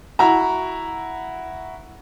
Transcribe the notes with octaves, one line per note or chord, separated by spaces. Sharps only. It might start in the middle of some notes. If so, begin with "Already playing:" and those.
E4 F#4 A#5